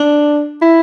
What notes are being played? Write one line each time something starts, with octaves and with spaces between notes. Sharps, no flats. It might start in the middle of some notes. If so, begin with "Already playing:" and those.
Already playing: D4
E4